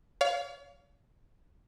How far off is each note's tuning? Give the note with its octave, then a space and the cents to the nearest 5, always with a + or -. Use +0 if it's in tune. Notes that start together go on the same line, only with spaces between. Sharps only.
C#5 +40 F5 +0